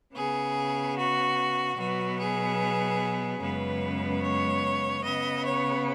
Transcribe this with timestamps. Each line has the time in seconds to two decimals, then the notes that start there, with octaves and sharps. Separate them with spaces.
0.15 C#3 B3 G#4
0.97 F#4
1.77 B2 F#3 B3 F#4
2.18 G#4
3.40 F#2 C#3 G#3 B3 B4
4.22 C#5
5.03 C#3 B3 D#5
5.44 C#5